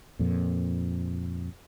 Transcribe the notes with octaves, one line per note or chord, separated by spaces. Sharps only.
F2 A#2